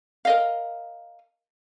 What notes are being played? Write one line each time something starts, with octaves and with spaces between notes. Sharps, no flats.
A#4 D#5 F5